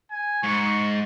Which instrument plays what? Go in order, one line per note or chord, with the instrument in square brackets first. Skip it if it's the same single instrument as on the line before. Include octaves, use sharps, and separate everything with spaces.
[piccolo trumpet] G#5
[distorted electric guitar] G#2 [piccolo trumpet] C#6